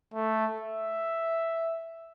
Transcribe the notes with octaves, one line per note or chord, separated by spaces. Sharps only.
A3
E5